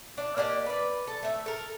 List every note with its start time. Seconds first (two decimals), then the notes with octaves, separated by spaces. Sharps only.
0.17 D4
0.37 A#3 D4 G4 D#5
0.66 B4 D5
1.07 A4
1.23 A3 E5
1.46 A4 A#4